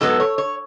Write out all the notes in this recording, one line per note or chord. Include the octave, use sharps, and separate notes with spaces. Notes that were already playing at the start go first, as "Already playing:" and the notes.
G#2 F#3 B3 A4
C#5
C#5